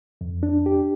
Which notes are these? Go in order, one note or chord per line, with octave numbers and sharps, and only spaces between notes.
F2
D4
G4